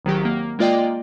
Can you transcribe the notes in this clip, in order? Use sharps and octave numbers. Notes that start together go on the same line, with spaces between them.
G#1 D#3 F#3 G4
A#3
G#3 A#3 F4 D5 D#5 G5